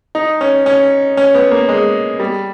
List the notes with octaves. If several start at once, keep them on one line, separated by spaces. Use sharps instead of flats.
D#4
C#4
C#4
C#4
B3
A#3
G#3
G3